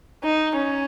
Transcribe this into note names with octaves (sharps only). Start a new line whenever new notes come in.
D#4
C#4